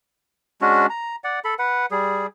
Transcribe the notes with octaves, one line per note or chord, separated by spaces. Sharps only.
G#3 C#4 D4 F#4
A#5
D5 F#5
A4 B5
B4 F#5
G3 G#4